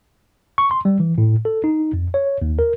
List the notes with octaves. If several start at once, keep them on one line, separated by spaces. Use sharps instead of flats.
C#6
C6
G3
E3
A2
A4
D#4
F2
C#5
D#2
A#4